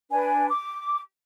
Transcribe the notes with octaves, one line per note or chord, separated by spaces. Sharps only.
D4 B4 G#5
D6